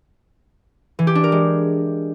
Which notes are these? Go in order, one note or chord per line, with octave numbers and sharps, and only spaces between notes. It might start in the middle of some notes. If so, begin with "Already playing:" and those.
E3
G4
D4
A#4
G#3